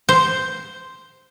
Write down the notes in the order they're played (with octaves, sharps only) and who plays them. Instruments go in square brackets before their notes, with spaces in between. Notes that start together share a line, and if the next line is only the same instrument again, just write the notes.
[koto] C5